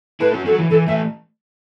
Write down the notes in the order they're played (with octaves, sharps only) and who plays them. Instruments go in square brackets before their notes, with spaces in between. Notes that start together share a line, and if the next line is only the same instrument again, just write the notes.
[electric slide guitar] E4 A4 [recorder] B4
[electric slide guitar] C#4 F#4
[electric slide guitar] C#4 F#4 [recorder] A4
[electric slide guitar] F#3
E3
[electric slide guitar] E3 [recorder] A4
[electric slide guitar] E3 A3 [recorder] E5